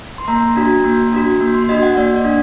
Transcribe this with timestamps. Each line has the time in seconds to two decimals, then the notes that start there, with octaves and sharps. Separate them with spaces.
0.18 C6
0.28 A#3 A#5
0.56 D4 F#4
0.84 A#3
1.13 D4 F#4
1.40 A#3
1.55 C6
1.69 D4 F#4 D#5
1.83 F#5
1.97 A#3 D5
2.16 D5
2.25 D4